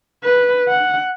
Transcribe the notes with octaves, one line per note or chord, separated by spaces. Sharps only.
B4
F#5